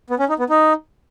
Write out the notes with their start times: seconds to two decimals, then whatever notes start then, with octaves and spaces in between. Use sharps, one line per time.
0.10 B3
0.19 C#4
0.29 D#4
0.39 B3
0.50 D#4